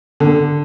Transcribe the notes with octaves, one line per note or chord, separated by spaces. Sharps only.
D3